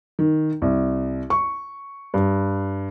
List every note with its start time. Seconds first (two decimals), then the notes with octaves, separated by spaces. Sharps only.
0.19 D#3
0.62 C2
1.30 C#6
2.14 G2